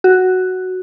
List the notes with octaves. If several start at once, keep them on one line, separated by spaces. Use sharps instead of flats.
F#4